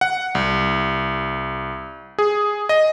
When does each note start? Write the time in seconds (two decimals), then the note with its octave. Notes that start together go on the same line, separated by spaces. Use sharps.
0.01 F#5
0.35 C2
2.19 G#4
2.69 D#5